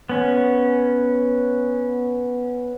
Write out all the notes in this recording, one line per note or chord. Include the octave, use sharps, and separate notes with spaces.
B3 C#4